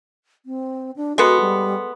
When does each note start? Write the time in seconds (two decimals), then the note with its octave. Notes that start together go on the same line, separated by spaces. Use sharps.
0.46 C4
0.96 D4
1.18 G#3 B3 F#4 A4 C6 C#7
1.41 G3